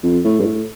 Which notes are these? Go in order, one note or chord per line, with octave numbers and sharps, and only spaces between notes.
F2
A2
G2
A2